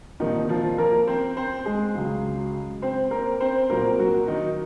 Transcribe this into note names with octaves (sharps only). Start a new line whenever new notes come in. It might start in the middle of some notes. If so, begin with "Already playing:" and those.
C2 A#2 D#3 F3 A#3 D#4
F3 F4
A#3 A#4
C4 C5
C4 C5
G#3 G#4
C#2 C#3 F#3
C4 C5
A#3 A#4
C4 C5
C2 A#2 F#3 A#3 A#4
F#3 F#4
D#3 D#4